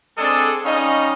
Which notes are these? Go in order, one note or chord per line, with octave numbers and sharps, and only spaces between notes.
G#3 C4 D4 G#4 A4
G3 C#4 D#4 C#5 D#5 F5